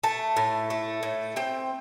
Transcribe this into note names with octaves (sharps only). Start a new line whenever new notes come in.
A3 A5
A2
A3
A2
C4 G5